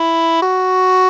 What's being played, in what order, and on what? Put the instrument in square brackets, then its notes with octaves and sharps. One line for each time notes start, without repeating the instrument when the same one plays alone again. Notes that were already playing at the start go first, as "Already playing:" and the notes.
Already playing: [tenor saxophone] E4
F#4